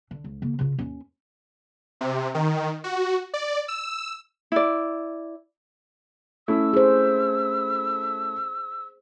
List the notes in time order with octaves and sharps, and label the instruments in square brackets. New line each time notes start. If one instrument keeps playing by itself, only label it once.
[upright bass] D3
C#2
C#3 A#3
C#3 F4
D#2 C#4
[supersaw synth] C3
D#3
F#4
D5
E6
[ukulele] E4 D5
[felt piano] A3 C#4 E4 [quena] E6
[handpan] G#4 C5